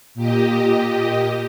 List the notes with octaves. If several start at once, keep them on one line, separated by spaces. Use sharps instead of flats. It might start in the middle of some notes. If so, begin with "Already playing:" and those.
A#2 G4 D#5